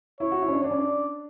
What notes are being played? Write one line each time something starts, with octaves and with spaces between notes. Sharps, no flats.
E4 C#5
F#4
E4
C#4
D4
D4 D5
C#4
D4